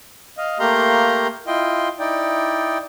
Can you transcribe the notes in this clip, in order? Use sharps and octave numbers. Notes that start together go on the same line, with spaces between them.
D#5 F5
A3 A#3 G4 F5 A#5 C6
E4 F4 D#5 G5 C6
D#4 E4 D5 G5